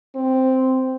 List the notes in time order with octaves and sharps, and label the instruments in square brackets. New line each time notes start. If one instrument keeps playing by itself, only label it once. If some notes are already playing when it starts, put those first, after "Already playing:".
[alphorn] C4